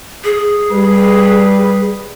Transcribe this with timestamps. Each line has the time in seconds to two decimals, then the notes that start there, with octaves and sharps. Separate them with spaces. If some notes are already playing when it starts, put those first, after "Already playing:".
0.25 G#4
0.71 G3 B4